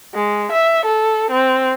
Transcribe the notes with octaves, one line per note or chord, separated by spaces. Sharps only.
G#3
E5
A4
C4